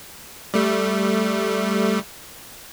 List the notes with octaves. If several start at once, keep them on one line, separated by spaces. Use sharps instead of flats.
G3 A3